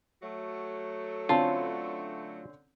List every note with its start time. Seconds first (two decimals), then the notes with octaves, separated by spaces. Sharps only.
0.22 F#3 A3
1.29 D3 C4 C#4 F4 A5 B5